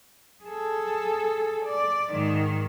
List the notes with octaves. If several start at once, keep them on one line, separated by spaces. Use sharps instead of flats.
G#4 A4
D5
G#2 D#3